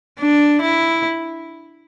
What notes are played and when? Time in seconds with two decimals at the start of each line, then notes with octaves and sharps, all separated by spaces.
0.20 D4
0.62 E4